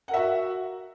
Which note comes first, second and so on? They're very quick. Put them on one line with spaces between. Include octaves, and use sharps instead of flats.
F#5 A#4 E5 F#4